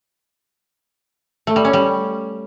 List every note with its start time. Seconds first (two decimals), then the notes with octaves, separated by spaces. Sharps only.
1.47 A3
1.56 G3
1.65 C#4
1.73 G3